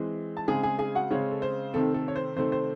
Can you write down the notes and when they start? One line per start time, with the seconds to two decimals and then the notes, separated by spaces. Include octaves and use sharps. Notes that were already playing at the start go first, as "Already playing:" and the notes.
Already playing: E3 G#3 C4
0.37 A5
0.48 C#3 G#3 C4 G#4 G#5
0.63 G#4 G#5
0.79 G#4 G#5
0.95 F#4 F#5
1.10 C#3 G#3 C4 C#4 C#5
1.31 A4
1.42 C5
1.74 C3 D#3 A3 C4 A4
1.94 A4
2.08 C#5
2.16 C5
2.36 C3 D#3 A3 C4 C5
2.52 C5